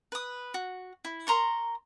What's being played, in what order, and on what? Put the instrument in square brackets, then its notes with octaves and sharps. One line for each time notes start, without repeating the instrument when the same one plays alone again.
[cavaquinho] B4 D#6
F#4
E4
A#4 A#5 C6 C#6